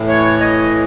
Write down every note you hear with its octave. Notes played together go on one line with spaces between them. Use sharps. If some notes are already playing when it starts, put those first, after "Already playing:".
Already playing: A2 E3
C#5
D#5